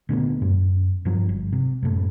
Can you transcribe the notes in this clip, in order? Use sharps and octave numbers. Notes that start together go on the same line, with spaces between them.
A#2 D3 A3 B3
F#2
G2 F3 F#3
G1
C3
F#2 A2